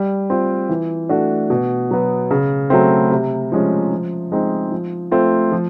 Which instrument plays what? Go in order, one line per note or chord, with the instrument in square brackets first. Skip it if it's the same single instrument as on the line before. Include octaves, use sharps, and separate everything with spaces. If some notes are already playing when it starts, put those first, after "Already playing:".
Already playing: [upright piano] G3
C4 F4
E3
A3 D4 F#4
B2
F#3 B3
C#3
F#3 A3 C4
C3
F3 G#3 C#4
F3
G#3 C4 D#4
F3
A3 C4 F4
F3